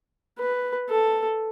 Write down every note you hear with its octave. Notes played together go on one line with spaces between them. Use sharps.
B4
A4